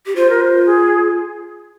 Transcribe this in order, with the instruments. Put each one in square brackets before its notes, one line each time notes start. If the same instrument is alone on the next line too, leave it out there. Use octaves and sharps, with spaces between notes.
[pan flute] G4
[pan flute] F4 [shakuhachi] C5
[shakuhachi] A#4
C5
G#4